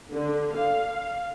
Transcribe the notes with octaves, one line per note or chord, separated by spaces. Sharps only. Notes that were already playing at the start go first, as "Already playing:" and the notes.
D3
F5